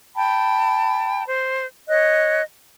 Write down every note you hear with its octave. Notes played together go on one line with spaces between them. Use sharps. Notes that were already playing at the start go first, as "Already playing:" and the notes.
G5 A5 B5
C5
C#5 D#5 F#6